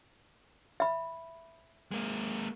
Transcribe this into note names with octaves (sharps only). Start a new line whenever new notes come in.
E5 B5
G#3 A#3